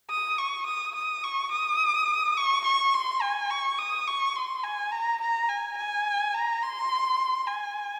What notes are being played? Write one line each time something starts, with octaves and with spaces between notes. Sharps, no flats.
D#6
C#6
D#6
D#6
C#6
D#6
C#6
C#6
C6
G#5
C#6
D#6
C#6
C6
G#5
A#5
A#5
G#5
G#5
A#5
C6
G#5